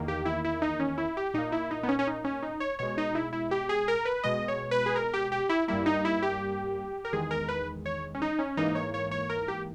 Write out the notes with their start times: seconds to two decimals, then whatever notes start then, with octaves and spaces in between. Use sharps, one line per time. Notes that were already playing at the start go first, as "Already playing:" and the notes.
Already playing: E2 D#3 A#3
0.08 G4
0.25 E4
0.44 E4
0.62 D#4
0.80 C#4
0.98 E4
1.17 G4
1.34 A#2 A#3 D#4
1.52 E4
1.71 D#4
1.83 B3
1.89 C#4
1.99 C#4
2.07 D#4
2.24 C#4
2.43 D#4
2.60 C#5
2.79 B2 G#3 C#5
2.98 D#4
3.15 E4
3.33 E4
3.51 G4
3.69 G#4
3.88 A#4
4.05 B4
4.23 B2 G#3 D#5
4.48 C#5
4.71 B4
4.86 G#4
4.96 A#4
5.14 G4
5.32 G4
5.49 E4
5.68 G2 G3 A#3 E4
5.86 D#4
6.05 E4
6.22 G4
7.05 A#4
7.13 E2 D#3 G#3 G#4
7.31 A#4
7.48 B4
7.86 C#5
8.15 C#4
8.22 D#4
8.39 C#4
8.57 G#2 E3 A#3 D#4
8.75 C#5
8.94 C#5
9.11 C#5
9.30 A#4
9.48 G4